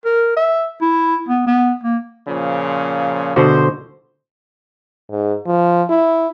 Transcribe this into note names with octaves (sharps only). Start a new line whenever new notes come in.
A#4
E5
E4
B3
B3
A#3
A#2 C#3 F3
B2 D3 F#4 C5
G#2
F3
E4